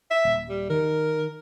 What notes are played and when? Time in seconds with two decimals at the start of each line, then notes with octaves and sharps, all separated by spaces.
0.11 E5
0.25 D#1
0.49 G3
0.70 D#3 A#4